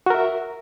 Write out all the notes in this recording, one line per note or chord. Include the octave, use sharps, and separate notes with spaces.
F#4 A#4 E5